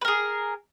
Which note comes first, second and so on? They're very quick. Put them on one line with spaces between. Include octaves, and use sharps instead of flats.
B4 A#4 G#4